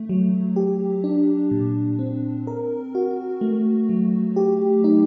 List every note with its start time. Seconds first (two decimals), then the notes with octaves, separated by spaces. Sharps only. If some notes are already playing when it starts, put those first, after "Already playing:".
Already playing: A3
0.09 F#3
0.56 G4
1.04 D4
1.51 A#2
1.99 C4
2.47 A#4
2.95 F#4
3.41 A3
3.89 F#3
4.36 G4
4.84 D#4